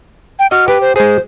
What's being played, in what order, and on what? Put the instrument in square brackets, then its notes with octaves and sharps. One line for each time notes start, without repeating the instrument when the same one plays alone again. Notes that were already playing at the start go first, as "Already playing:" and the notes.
[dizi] G5
[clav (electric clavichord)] F#4 D#5 [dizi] F6
[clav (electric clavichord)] G4 [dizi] B4
[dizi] C5
[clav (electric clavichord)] G#3 G#4 [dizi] C5